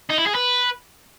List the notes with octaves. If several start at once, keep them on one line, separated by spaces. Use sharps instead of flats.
D#4
E4
G#4
B4